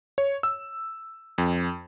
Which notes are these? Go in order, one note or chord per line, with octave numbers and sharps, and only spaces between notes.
C#5
E6
F2